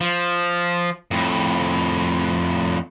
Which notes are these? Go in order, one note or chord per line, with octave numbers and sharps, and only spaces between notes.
F3
F2 A2